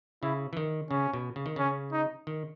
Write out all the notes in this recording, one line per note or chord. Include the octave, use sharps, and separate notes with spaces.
C#3 E4
E3
D#3
C#3 C#4
B2
C#3
D#3
C#3 C#4
D#4
D#3